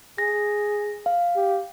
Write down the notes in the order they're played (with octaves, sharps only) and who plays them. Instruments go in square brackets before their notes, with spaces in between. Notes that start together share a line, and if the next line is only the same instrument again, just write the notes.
[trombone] G#4 [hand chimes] A#6
[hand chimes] F5
[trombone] G4